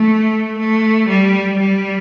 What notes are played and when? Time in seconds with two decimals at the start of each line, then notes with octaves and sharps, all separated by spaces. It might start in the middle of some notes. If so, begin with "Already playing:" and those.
Already playing: A3
0.58 A3
1.08 G3
1.59 G3